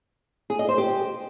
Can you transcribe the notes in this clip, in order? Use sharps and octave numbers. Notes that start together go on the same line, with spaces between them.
G#4
D#5
C5
G4